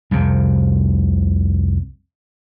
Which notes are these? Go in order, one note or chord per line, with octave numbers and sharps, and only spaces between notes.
C2 F2 C3